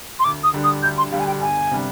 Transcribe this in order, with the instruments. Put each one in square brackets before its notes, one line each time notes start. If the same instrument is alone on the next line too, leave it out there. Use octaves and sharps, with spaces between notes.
[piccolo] C6
[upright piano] D2 [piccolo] D6
[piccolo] D#6
[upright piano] D3 G3 D4 G4
[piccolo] D#6
[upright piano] D2 [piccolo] G6
[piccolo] C6
[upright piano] D3 G3 D4 G4 [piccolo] F5
[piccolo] G#5
G5
[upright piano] G1 [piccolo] G#5
[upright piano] C3 G3 D4